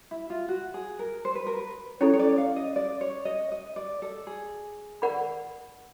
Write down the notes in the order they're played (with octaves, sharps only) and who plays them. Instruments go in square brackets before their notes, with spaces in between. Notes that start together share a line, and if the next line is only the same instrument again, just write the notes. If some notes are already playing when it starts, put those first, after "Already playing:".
[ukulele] E4
F4
F#4
G#4
A#4
C5
B4
A#4
B4
[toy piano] C#4 E4 A4 [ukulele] C#5
[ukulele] C#5
D5
F5
D#5
D5
C#5
D#5
D#5
D5
A4
G#4
[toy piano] A#4 D5 F#5 B5